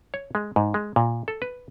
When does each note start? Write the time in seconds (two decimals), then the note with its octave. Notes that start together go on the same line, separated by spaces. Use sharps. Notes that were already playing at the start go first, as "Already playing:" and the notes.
0.14 C#5
0.35 G#3
0.56 G#2
0.74 G#3
0.96 A#2
1.28 A4
1.42 B4